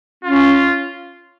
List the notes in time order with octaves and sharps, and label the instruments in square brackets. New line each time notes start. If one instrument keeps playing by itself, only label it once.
[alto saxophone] C#4 [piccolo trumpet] F4